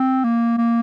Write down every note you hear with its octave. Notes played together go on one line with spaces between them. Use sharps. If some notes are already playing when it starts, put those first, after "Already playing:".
Already playing: C4
A#3
A#3